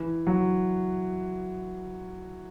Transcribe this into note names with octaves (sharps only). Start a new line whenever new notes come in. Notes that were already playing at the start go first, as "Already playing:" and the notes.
Already playing: E3
F#3